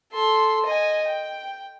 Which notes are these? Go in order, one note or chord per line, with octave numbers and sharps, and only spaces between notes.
A4 C6
D#5 G#5
G5